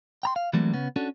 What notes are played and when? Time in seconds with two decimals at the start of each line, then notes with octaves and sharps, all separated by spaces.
0.23 G5 A#5 C6
0.36 F5
0.53 E3 F#3 G3 A3 A#3 C4
0.73 C#3 B3 C#4
0.96 C#4 D4 F#4 A4